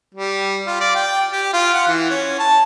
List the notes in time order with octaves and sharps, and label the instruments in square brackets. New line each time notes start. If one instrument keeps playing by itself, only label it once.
[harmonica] G3
F4
D5
G5
G4
F4
F#5
E3
C#4
A5